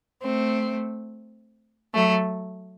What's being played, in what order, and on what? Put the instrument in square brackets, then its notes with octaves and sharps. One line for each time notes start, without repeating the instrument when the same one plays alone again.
[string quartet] A3 C4
F#3 A3